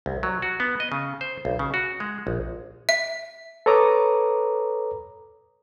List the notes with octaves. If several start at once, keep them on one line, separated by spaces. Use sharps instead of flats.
C2
F#3
F#4
B3
D#5
C#3
C5
B1
C#3
F#4
G#3
A#1
E5
A4 B4 C#5 A#5 D6 D#6